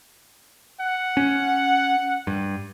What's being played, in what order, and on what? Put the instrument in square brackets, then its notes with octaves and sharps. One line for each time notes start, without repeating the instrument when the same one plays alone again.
[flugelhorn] F#5
[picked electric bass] C#4
G2